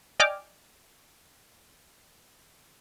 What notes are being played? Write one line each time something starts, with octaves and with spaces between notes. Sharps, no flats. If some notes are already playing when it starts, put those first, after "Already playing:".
D5 D#5 G5 G#5 D6 F6